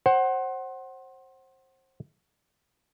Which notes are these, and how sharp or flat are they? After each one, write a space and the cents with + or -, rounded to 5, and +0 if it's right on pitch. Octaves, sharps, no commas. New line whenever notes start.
C5 +25 F#5 +20